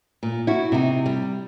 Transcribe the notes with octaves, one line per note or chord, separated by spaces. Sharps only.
A#2
E4 F#4
C3 D#4
G3